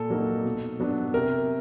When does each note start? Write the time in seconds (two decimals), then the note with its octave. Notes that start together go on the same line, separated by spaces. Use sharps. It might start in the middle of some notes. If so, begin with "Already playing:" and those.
Already playing: A#2 A4
0.10 F#3 A#3 D#4
0.45 B2
0.80 F#3 B3 D4
1.14 C3 A#4